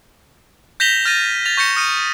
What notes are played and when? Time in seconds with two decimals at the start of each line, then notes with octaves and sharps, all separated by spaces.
0.80 G6 A#6 B6 E7 F7 G7
1.05 F6 A6 A#6 D#7
1.45 A6 F7
1.57 C#6 G6 A#6 C#7 E7
1.76 D#6 F6 C#7 D#7